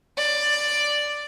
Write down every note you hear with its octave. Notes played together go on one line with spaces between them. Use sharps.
D5